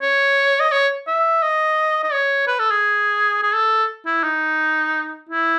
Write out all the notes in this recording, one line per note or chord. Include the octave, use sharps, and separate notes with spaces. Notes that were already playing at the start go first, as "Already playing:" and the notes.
C#5
D#5
C#5
E5
D#5
D#5
C#5
B4
A4
G#4
G#4
A4
E4
D#4
E4